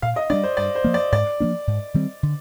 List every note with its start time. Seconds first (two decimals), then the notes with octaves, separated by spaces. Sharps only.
0.02 A#2 F5
0.16 D#5
0.30 G3 A#3 D4 D5
0.43 C5
0.57 G2 D5
0.75 C5
0.84 F3 A#3
0.94 D5
1.12 G#2 D5
1.40 F3 A#3 D4
1.67 G#2
1.94 D#3 G3 C4
2.23 D3